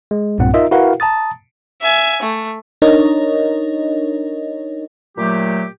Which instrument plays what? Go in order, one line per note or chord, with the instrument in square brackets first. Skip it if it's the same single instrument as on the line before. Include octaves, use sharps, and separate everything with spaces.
[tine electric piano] G#3
B1 G2 A#2 C4 F#5
D#4 F4 A#4 D#5 E5
E4 F#4 A#4 B4 F5 F#5
A5 A#5 D#6 A6
[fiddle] E5 G#5
A3
[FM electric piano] D4 D#4 A#4 C#5 D#5
[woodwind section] A#2 F#3 A3 G4